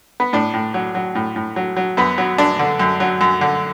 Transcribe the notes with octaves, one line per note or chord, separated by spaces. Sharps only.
B3
A2 D4
A2
F#3
F#3
A2
A2
F#3
F#3
F#2 B3
F#3
F#2 D4
D3
F#2
F#3
F#2
D3